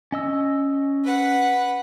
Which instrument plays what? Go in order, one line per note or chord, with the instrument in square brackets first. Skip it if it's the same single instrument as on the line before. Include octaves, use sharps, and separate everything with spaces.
[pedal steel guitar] C#4 D#5 E6
[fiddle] B4 F#5